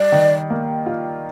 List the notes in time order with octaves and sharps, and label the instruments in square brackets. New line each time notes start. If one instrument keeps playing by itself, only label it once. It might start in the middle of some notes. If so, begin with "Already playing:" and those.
Already playing: [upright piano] G3 [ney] D5
[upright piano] D#3
A#3
F4